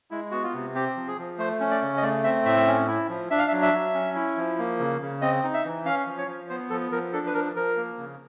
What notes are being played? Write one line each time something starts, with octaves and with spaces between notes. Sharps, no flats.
G#3 E4
B3 F#4
F4
C3
C4 G4
F3
G#4
F3
A3 C5
C#4
D5
C#3
D#5
A3 D5
C4 E5
A2 E5
C#4
E4
F3
D4 E5
F5
E5
F#3
E5
F#3
C#4
E4
F3
A#3
C#3
C#3
C4 D#5
D#4
E5
E3
C#4 F5
F3
C#5
F3
B3 C5
F3 A4
F3 A#4
D4 A4
B4
F3 A#4
F3 A#4
A#3
C#3